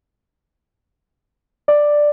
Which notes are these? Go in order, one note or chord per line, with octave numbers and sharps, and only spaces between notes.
D5